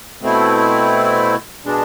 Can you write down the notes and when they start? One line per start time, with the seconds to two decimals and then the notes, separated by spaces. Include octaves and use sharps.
0.21 B2 A3 C4 E4
1.64 B2 G#3 D4